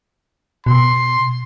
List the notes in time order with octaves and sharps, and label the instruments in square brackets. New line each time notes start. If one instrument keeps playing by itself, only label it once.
[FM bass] B2 [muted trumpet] C6